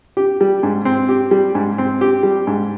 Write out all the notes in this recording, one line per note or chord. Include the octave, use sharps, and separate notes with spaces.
G4
G3
G#2
C4
G4
G3
G#2
C4
G4
G3
G#2